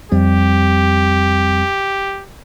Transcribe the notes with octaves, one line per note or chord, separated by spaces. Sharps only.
F2 G3 C4 G4